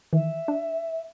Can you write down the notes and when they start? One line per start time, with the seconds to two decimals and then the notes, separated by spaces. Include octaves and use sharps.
0.13 D#3 E3 E5
0.48 D4